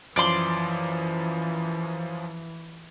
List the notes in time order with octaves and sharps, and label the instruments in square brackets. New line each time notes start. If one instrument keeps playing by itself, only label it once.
[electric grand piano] F#2 F3 [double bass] E3 [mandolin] D5 C6